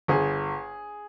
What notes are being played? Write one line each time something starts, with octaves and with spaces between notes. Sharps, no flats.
G1 G#4